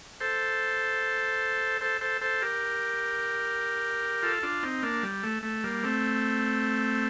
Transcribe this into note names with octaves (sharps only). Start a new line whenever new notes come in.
A4 C5
A4 C5
A4 C5
A4 C5
G4 A#4
F4 A4
D4 F4
C4 D#4
A#3 D4
G3
A3
A3
G3 A#3
A3 C4